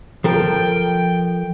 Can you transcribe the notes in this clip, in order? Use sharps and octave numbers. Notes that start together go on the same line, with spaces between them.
F3 A4 A#4 G5